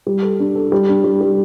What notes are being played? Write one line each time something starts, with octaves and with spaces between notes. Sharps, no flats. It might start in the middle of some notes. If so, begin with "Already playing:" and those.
G3
A4
D4
A4
G3
D4
G3
G3